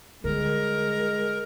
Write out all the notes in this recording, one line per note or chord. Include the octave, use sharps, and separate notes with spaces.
D3 G3 G#3 A#4